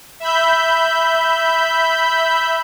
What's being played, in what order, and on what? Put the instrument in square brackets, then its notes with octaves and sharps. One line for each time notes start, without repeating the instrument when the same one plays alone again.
[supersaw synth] E5 B5 G6